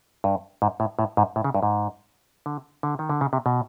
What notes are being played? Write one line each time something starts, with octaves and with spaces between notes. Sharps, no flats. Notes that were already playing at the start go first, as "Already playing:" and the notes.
G2
G#2
A2
A2
G#2
A2
C#3
G2
G#2
D3
D3
D#3
D3
C#3
C3
B2